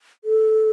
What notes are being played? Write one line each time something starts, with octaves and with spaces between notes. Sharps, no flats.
A4